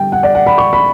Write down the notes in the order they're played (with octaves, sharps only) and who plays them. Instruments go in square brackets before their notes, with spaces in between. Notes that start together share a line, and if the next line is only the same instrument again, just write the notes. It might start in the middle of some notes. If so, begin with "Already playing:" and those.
Already playing: [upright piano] D3 G3 G5
F#5
D5
F#5
B5
C#6
B5